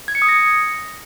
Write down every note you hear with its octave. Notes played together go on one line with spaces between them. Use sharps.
G#6
C#7
D#6
A#6
C#7